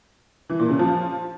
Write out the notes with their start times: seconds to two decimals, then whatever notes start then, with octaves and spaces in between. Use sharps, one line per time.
0.50 E3
0.59 A#2
0.69 C#3
0.79 F3